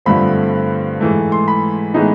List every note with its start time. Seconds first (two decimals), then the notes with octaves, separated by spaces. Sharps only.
0.06 G2 D3 F3 A3 C4 B5
1.00 G#2 E3 A3
1.32 C6
1.48 B5
1.94 A2 E3 G#3 B3 D#4